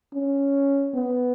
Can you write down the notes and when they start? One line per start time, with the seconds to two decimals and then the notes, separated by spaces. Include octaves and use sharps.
0.13 C#4
0.95 B3